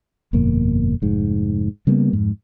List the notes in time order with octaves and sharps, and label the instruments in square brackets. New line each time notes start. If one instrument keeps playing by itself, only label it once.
[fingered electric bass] G1 F2 B2 A#3
F1 G#2
C#3 G3 A#3 B3
F2 G#2